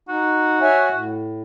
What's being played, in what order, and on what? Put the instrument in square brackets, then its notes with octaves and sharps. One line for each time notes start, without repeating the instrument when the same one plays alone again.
[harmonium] D#4 [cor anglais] F#4
[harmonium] C#5 E5 G#5
A2